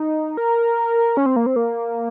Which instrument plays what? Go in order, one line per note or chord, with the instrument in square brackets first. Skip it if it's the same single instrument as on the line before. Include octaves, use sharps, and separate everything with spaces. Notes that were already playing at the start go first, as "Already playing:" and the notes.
Already playing: [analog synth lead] D#4
A#4
C#4
C4
A#3
C4
A#3